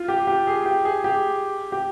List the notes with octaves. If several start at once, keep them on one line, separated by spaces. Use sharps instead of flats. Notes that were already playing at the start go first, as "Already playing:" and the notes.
Already playing: F4
G4
G4
G#4
G4
G#4
G4
G4